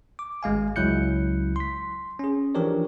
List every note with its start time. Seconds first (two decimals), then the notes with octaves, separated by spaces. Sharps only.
0.19 D6
0.43 G#1 G#3 F5 G#5
0.76 C#2 F#3 E4 F#6 G6 C#7
1.56 C6 B6
2.19 C#4 G#4
2.55 E3 F3 D4 G4 A#4 C#5